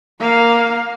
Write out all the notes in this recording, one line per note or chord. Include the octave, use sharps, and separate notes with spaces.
A#3 F5